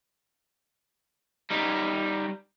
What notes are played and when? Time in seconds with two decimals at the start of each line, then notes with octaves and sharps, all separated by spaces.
1.50 G3 D#4